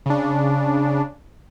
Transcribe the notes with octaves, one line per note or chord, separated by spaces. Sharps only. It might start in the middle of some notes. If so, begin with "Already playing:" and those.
C#3 D4